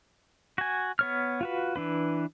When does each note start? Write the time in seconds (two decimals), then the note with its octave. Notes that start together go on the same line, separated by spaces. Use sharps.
0.58 F#4 G#5
0.99 B3 C#5 F6
1.41 F4 F#4 B4
1.76 E3 D4 B4